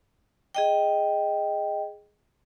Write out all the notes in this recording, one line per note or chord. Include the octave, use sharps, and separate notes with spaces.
G#4 D#5 G5